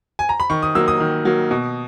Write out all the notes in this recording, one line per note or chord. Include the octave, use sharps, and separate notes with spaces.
G#5
A#5
B5
D#3 C#6
D#6
F#3 A#3 E6
D#6
D#3
F#3 A#3
B2